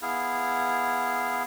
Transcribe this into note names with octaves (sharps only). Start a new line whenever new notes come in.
B3 E4 G#4 F5